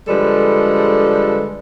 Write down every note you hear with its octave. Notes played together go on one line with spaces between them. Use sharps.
D3 F3 G3 G#3 A4 B4